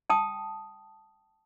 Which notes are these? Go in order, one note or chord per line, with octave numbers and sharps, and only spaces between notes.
G5 A5 D#6